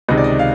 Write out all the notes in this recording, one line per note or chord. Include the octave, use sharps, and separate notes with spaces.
C#2 C3 D#3 D#5
D5
D#5
F5